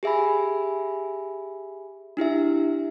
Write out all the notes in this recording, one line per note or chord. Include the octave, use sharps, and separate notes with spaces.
G4 G#4 E5 G#5 B5
D4 E4 G4 E5